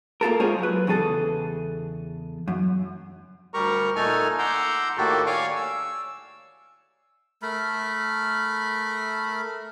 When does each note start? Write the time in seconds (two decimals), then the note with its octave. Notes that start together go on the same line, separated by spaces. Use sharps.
0.21 A#3 F4 A4 A#4
0.40 G#3 C#4 F4 G#4 C5 C#5
0.59 F#3 B4
0.87 E2 C#3 G#4 A4
2.48 F#2
3.54 D2 G3 G4 A#4 A#5 C#6
3.96 A#2 A3 D#4 A4 G#5 F6
4.39 F#5 A#5 C6 D6 E6 G6
4.97 A2 D#3 A#3 F#4 G4 A4
5.26 C#5 D5 F5 G#5 C#6 D6
5.56 E6
7.42 A3 A#4 B5